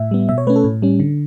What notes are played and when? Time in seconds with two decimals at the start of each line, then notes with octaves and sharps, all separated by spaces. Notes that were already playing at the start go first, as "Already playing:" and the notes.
Already playing: A2 E5
0.11 G3 B3
0.29 B2 E5
0.38 C#5
0.47 A3 C#4 B4
0.56 A4
0.64 A2
0.82 G3 C#4
1.00 D3